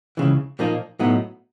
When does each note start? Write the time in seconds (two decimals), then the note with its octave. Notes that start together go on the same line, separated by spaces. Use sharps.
0.17 C#2 C#3 E3
0.59 A#2 F3 A#3 D#4
0.99 A2 F#3 B3 D#4